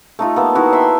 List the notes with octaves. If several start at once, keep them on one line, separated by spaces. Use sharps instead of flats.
A3 D#4 F4
A#3 B3 A4
D#3 E4 F#4
E5 G5 B5 C6